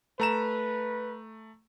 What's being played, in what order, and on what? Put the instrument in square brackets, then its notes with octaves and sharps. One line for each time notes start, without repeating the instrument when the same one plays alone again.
[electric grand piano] A3 A#5 E7 [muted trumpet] B4